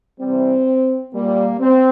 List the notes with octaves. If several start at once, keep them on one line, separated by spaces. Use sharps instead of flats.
C3 E3 G3 C4
A#2 G3 A#3
C4